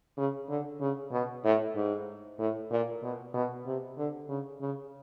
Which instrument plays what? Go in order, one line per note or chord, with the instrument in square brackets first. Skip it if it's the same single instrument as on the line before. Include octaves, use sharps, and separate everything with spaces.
[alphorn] C#3
D3
C#3
B2
A2
G#2
A2
A#2
B2
B2
C3
D3
C#3
C#3